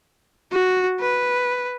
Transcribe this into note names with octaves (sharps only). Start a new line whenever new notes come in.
F#4
B4